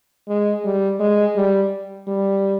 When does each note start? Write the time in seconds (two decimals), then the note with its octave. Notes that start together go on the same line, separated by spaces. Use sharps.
0.28 G#3
0.65 G3
1.00 G#3
1.36 G3
2.07 G3